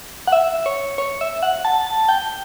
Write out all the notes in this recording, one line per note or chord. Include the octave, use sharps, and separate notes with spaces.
F#5
E5
C#5
C#5
E5
F#5
A5
A5
G5